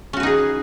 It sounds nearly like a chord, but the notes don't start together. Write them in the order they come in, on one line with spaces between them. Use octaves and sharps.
C#4 F#4 B4 D#4 G#4